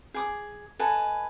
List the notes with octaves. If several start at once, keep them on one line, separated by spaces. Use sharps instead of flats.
G#4 D6 D#6
A4 B4 D#5 G#5